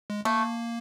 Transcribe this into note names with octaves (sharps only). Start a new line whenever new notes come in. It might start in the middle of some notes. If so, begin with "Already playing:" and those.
G#3
A3 A#3